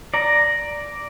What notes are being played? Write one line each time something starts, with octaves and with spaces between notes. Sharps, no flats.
D5 A#5